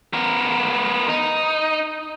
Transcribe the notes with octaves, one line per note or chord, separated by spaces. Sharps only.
B3 A#4
D#4